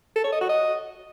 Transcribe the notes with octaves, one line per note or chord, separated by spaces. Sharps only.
A4
C#5
D#5
F#4
D#5